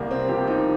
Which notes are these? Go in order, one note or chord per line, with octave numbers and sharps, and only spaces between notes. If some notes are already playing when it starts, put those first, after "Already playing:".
Already playing: C2 A#3
C4
C3 F3 G4
D#4